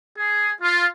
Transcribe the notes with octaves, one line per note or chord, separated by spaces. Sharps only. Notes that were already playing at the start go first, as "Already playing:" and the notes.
G#4
F4